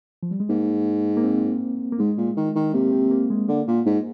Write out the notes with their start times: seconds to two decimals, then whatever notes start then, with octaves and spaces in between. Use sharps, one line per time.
0.23 F3
0.31 G3
0.40 G#3
0.49 G#2 A#3
1.17 A#3
1.24 C4
1.92 A#3
1.99 G#2 G#3
2.17 A#2
2.37 D#3
2.55 D#3
2.74 C3 A#3
2.93 C4
3.11 A#3
3.30 G#3
3.48 D3 A#3
3.68 A#2
3.86 G#2